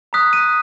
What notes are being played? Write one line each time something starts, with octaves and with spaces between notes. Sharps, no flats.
A#5 D#6 F#6 B6
D#7